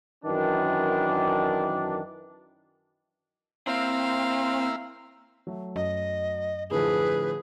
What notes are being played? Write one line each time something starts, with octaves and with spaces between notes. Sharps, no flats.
F#2 D#3 E3 D4
A#3 C4 E4 F5
F#3 A3
F#2 D#5
A2 D3 F3 G#4 B4